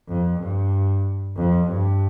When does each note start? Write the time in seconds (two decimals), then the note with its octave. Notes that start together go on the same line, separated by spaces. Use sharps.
0.09 F2
0.40 G2
1.36 F2
1.68 G2